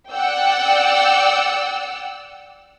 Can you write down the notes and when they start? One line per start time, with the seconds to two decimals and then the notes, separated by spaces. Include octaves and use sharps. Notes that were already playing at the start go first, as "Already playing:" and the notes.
0.11 D5 F#5 G5 E6